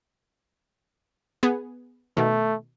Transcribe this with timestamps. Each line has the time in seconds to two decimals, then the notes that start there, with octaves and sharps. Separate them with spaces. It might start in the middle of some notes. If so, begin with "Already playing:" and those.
1.43 B3 G#4
2.17 B2 D#3 A3